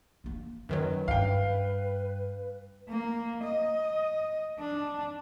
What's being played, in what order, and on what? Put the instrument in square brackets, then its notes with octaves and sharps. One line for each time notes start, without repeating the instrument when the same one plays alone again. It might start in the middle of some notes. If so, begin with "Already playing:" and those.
[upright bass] D3 A#3
[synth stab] F#2 D#3 F#3 [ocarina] B4
[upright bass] G2 [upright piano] F5 G5
[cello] A#3
D#5
D4